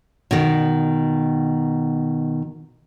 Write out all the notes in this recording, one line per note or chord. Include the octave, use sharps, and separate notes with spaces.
B2 D#3